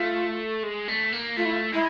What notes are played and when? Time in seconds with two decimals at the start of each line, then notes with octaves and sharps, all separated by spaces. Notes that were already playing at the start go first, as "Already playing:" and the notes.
Already playing: A3 F4
0.64 G#3
0.88 A3
1.12 A#3
1.37 A3 F4
1.45 E4
1.52 F4
1.73 G#3 E4